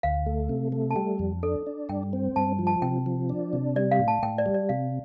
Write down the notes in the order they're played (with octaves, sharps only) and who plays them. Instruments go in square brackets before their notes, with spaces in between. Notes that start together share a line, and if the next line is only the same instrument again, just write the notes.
[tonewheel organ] D2 [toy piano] F5
[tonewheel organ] A3
C3
A3
[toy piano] A5
[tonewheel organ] G3 [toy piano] G5
[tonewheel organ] F2
[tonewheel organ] D4 [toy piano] A4
[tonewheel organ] D4
[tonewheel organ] G2 [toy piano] G5
[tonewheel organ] C4
[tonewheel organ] G2 [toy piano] A5
[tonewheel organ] F3
[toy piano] A5
[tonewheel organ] C3 [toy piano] G5
[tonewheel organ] F3
D4
C3
[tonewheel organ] G3 [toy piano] D5
[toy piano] F5
[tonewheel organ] A2
[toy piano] A5
[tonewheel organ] A2 [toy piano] G5
[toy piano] D5
[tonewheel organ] G3
[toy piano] D5
[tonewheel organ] C3 [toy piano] F5